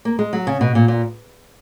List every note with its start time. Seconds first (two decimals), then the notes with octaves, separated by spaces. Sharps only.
0.05 A#3
0.19 G#3
0.33 F#3
0.47 C#3
0.61 B2
0.75 A#2
0.88 A#2